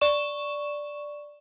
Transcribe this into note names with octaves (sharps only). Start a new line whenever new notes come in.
D5 C#6 E7